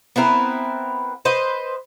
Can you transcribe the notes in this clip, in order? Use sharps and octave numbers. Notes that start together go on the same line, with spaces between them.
B3 C4 E4 A#4
B4 C5 D#5